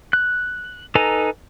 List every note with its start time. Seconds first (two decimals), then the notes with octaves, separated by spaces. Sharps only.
0.13 F#6
0.95 D#4 A4 B4 G#5 A#5